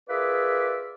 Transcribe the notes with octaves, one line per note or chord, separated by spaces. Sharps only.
F4 G#4 A#4 B4 D5 E5